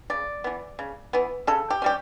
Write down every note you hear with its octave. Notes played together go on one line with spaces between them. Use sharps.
C#3 D5
E3 B3
C#3
E3 B3
C#3 A4
G4
G3 C#4 G4